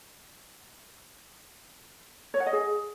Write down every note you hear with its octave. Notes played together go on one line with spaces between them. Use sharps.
C#5
F#5
D#5
G#4